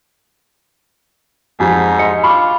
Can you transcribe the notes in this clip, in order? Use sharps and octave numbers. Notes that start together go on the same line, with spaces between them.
F2 G#2 G3
D#5 C6 C#7
F4 B5 C#6 D6